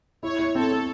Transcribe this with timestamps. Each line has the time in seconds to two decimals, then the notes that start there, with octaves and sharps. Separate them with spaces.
0.22 E4 C#5
0.39 E4
0.55 C4 A4
0.71 A4